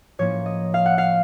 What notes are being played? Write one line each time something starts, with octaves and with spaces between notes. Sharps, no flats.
A2 F3 A#3 C#4 C#5
D#5
F5
F#5
F5